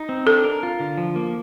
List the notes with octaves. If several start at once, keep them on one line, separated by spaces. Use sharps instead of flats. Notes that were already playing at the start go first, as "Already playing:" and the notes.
Already playing: D#4
C4
D4 A4
A#4
F4
D3
F3
A#3